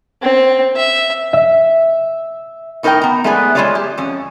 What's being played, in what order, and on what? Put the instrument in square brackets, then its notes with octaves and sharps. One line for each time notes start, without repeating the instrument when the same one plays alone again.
[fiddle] C4
E5
[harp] E5
[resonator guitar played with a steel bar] A2 D#4 A#4 B4 D#5 G5
B3 A#5
G#3 A3 B3 G#4 B4 D5
G#3 A3 F4 G#4 C#5 D5
G4
F2 C#4